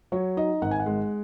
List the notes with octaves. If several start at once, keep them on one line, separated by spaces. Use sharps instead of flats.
F#3 C#5
D#4 D#5
G#1 F#5
G#5
F#5
G#3